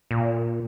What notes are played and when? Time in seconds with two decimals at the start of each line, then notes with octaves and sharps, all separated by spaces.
0.11 A#2